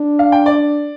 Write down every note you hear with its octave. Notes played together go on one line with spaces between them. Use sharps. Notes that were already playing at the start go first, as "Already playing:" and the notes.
Already playing: D4
F5
G5
D5